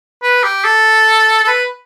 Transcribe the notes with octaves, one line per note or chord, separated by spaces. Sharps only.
B4
G4
A4
A4
B4